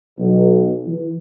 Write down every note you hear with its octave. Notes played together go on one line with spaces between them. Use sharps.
B1
E3